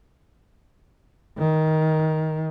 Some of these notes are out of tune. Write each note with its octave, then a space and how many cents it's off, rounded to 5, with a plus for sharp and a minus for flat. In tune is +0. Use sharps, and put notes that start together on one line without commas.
D#3 +15